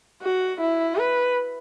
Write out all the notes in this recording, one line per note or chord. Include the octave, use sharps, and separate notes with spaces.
F#4
E4
B4